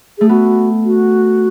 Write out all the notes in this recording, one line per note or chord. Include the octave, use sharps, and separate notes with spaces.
A3 G#4
B3 F#4
F#4